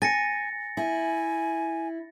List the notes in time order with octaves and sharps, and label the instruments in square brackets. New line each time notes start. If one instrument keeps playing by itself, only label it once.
[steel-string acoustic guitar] G#5 [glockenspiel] A6 A#6 C#7
[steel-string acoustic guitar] E4 [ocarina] G#5